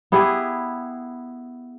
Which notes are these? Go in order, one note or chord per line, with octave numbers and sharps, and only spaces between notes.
B3 E4 G4 G#4